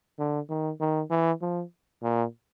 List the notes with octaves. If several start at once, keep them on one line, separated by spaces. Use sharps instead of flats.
D3
D#3
D#3
E3
F3
A#2